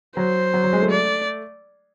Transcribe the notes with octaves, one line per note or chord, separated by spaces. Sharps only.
F#3 C5
F#3
F#3
G#3
A3
D5